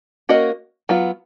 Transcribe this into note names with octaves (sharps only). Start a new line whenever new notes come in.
A#3 C#4 F#4 A#4 D#5
F#3 B3 F4